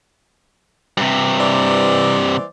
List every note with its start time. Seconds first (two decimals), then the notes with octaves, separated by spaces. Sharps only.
0.97 G2 C3
1.40 E3 C5 D5